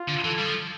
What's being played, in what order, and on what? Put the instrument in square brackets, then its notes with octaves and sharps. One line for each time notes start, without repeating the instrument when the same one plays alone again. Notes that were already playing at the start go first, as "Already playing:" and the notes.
Already playing: [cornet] F4
[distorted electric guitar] D3
[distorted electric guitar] E3 [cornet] A4
[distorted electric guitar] G3
F3